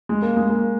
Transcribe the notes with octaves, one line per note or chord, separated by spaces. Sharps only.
G#3
A#3
G#3
A#3